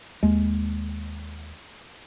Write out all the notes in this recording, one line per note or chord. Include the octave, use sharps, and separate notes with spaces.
D#2 G#3